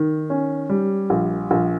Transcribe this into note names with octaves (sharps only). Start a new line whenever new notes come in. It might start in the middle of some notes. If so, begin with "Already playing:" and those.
Already playing: D#3
C#4
G3
A#1
A#1